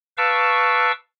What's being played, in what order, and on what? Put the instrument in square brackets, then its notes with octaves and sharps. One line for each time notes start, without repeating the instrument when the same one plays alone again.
[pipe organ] B4 F5 A5 C#6 D6 E6